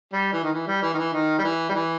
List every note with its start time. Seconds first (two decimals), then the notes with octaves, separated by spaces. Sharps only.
0.13 G3
0.33 E3
0.43 D#3
0.52 E3
0.67 G3
0.82 E3
0.93 D#3
0.98 E3
1.13 D#3
1.39 G3
1.44 E3
1.69 G3
1.74 E3